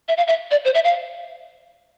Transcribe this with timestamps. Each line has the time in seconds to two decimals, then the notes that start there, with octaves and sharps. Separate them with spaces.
0.08 E5
0.18 F5
0.28 E5
0.51 D5
0.65 C5
0.75 E5
0.84 F5